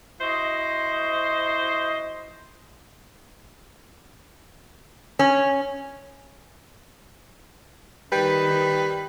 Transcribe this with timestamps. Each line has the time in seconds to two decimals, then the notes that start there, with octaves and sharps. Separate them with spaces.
0.20 E4 F#4 C5 D#5
5.19 C#4
8.12 D#3 G3 B4 G5